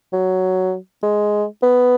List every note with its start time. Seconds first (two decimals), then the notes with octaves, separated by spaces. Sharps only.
0.13 F#3
1.03 G#3
1.63 B3